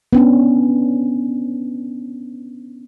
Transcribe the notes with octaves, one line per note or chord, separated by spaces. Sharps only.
B3 C#4 D4